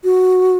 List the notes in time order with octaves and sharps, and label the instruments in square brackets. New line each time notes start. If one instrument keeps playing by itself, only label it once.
[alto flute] F#4